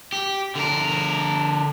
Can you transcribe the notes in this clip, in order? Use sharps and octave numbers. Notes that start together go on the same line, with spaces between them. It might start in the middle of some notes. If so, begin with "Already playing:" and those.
G4
D3 A#4